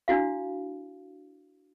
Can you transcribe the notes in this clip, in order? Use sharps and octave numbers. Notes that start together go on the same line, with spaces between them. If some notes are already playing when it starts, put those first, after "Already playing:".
D4 E4 F#4 F5